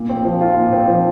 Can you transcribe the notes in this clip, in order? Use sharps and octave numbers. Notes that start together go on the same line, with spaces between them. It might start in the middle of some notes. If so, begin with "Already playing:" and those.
Already playing: A#2
C4
F3
F4
A#2
C4
F3